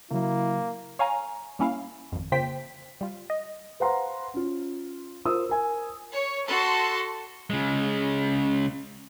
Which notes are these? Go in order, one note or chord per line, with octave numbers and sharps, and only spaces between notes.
C#3 F#3 A#3 E4
C#5 F5 G#5 A#5
G3 A#3 C#4 E4 F5
G#1 F2
C#3 A#3 F4 C5 G5 B6
G3 F4
D#5
B4 C5 F5 F#5 A#5 C6
C#4 F4
F4 A#4 C5 D#6 E6
A#4 G#5
C#5
F#4 A4 C6
C#3 G#3